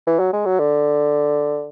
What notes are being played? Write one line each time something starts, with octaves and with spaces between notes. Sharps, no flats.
E3
F#3
G#3
F#3
D3